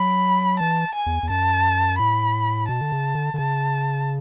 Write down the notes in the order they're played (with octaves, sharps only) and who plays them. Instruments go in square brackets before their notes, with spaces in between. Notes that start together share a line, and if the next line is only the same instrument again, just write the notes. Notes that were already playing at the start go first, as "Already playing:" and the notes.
Already playing: [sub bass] F#3 [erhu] B5
[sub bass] E3 [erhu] A5
[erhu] G#5
[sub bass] E2
E2
[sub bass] F#2 [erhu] A5
[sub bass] A2 [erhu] B5
[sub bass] B2 [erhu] A5
[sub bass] D3
C#3
D3
D3
[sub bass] C#3 [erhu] A5